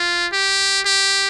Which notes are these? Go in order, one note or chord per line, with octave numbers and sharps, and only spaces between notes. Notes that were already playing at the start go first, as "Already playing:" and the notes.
Already playing: F4
G4
G4